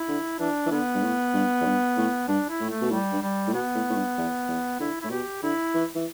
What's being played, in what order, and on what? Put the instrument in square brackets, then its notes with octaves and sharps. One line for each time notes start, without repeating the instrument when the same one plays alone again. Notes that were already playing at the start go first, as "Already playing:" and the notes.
Already playing: [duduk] E4
[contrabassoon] D3
[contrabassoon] E3 [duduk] D4
[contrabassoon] E3
[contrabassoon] D3 [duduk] B3
[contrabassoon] G2
A2
G2
E2
G2
A2
[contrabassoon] G2 [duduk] D4
[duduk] E4
[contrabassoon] A2
[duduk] A3
[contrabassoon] B2
[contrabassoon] A2 [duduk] G3
[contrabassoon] G2
[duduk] G3
[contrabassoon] A2
[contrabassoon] B2 [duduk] B3
[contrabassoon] A2
A2
G2
E2
E2
[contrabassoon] D3 [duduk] E4
[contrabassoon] A2 [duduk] E4
[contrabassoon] B2 [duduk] G4
[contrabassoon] D3 [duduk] E4
[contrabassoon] E3
E3